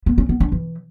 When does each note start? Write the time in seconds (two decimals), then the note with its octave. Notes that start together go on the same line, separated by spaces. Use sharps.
0.06 B3
0.18 C#4
0.29 B3
0.40 D4
0.52 E3